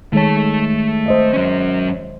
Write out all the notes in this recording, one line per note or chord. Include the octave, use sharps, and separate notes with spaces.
D#3 G#3 A3 C#5 A5
C5 D#5 E5
F#3 C#4